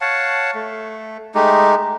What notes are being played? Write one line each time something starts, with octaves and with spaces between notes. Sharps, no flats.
C#5 F5 F#5 A5
A3
G#3 A3 D#4 G4